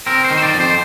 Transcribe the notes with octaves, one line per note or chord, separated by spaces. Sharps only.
C4 A#4
C5
D#3
C5
D5
F2
C5